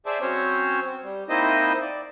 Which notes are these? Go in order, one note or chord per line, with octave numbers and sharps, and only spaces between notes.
G#4 C5 D5 E5 A5
F#3 C4 C#4 C5 C#5
C4
G3
A#3 C4 D#4 E4 C5 D#5
D5